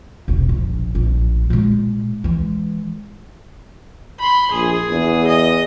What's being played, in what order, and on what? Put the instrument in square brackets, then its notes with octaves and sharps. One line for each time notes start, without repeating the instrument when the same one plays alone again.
[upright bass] E1 C2
A#1
A#1 A2
A#2 G#3
E3 G#3
[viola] B5 C6
[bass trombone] A#1 [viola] G#4
[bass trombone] E2
[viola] D#5